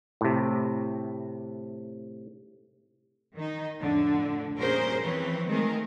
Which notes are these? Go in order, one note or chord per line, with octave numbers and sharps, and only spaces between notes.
A2 C3
D#3 D#4
F2 A2 D3
A#2 G3 C#4 G#4 A#4 C5
E3 F3 C4 B4 C#5
D#3 G#3 A3 C4 G#4 A#4